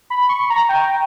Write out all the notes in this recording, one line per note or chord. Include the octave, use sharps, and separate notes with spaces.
B5
C#6
A#5
G5